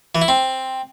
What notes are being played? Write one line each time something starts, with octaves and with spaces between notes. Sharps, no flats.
E3
E4
C4